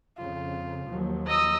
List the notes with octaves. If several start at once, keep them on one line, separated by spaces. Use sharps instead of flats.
F2 C#3 F4
D#2 F3 F#3
D#5 A#5 D#6 E6